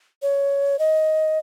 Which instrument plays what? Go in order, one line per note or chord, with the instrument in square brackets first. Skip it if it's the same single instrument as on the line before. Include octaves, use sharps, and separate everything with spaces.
[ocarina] C#5
D#5